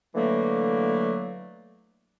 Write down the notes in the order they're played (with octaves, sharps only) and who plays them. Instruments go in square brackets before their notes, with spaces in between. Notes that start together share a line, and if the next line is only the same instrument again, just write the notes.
[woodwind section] D3 E3 F#3 A3 A#3